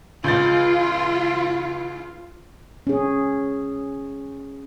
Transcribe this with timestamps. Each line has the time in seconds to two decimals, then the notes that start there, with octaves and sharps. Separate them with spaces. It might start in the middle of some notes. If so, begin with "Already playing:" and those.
0.24 C#2 F4 G6 A6
2.87 C#4 G#4